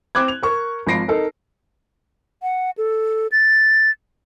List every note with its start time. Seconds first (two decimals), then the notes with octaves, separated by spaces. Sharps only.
0.15 C4 D6 F#6 G#6
0.28 F7
0.43 A#4 C#6
0.87 G#1 F3 B5 A#6 C7 D7
1.08 D#4 A4 A#4
2.43 F#5
2.78 A4
3.32 A6